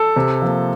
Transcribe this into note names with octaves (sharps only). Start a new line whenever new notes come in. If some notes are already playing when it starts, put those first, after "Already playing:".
Already playing: A4
C3
F3 A#3